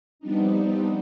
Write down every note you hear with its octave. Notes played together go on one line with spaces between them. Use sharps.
F3 G3 B3 C4 D4 D#4